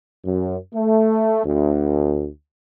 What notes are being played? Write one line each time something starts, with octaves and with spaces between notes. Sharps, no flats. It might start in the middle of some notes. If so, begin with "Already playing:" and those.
F#2
A3
D2